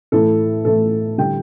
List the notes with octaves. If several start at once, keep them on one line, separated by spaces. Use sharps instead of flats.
A2 E3 A3 A4
A2 E3 A3 A4
D3 G3 G5